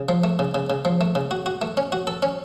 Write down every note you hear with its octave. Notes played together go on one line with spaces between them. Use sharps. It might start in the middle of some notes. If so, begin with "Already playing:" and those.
Already playing: C#3
F3
A3
C#3
C#3
C#3
F3
A3
C#3
F#4
F#4
A3
C#4
F#4
A4
C#4